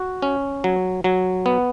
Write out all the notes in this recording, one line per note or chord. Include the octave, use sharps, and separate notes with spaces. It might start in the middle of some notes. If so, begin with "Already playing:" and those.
Already playing: F#4
C#4
F#3
F#3
B3